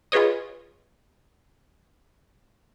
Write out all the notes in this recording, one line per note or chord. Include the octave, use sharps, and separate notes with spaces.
F4 G#4 B4 C#5 D#5